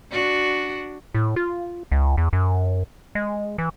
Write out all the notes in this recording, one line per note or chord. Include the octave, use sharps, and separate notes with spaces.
D4 F#4
A2
F4
C#2
E2
F#2
G#3
E3